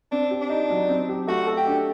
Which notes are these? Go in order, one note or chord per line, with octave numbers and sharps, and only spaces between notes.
C4 D4
G4
D4
D#4
F#3
C4
G4
A3 F#4
A4
G4
D4